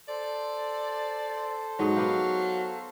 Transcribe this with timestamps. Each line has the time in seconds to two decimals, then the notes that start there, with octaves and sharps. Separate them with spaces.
0.08 A4 C5 D5
1.79 G#2 F#3 D#5
1.97 B3 G4 F5